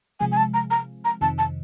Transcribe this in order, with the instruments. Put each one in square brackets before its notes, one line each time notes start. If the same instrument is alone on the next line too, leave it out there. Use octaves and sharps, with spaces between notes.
[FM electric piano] C3 F3 G#3 [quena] G#5
[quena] G#5
A5
A#5
A#5
A#5
[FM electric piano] F2 C3 D#3 [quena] A5
[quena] A5